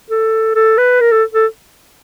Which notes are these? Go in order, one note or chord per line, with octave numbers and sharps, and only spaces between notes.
A4
A4
B4
A#4
A4
A4